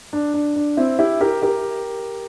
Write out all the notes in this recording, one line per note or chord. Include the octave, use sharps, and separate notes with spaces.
D4
D4
D4
C4 E4
E4 G4
G4 A#4
G4 A#4